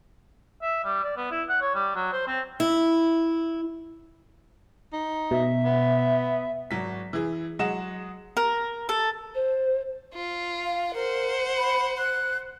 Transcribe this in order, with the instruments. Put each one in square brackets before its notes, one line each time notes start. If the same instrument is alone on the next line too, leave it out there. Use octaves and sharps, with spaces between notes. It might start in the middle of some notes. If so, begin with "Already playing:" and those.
[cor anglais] E5
G3
D5
B3
E4
F#5
C#5
G3
F#3
C5
C4
[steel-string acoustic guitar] E4
[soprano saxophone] D#4
[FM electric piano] B2 [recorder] E5
[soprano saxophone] B3
[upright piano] G#1 F#3 B6
E3 G#4
F#3 G#3 D#5 F#5 E7
[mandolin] A#4
A4
[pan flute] C5
[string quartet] F4
[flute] F5
[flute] A#4 [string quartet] C5 F#5
[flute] B5
F#6